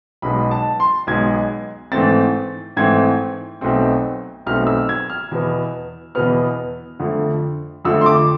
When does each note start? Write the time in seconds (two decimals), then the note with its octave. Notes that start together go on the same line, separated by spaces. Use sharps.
0.22 B1 B2 G#3 B5
0.51 A5
0.80 C6
1.07 B1 B2 G#3 G#6
1.92 G#2 E3 A3 C4 A6
2.77 G#2 E3 A3 C4 G#6
3.61 B1 B2 A3 C4
4.46 B1 B2 A3 C4 F6
4.67 E6
4.89 G#6
5.10 F6
5.31 E2 B2 B3
6.15 E2 B2 B3 F6
7.00 F2 D3 A3
7.85 F2 D3 A3 E6
8.01 C6
8.06 D6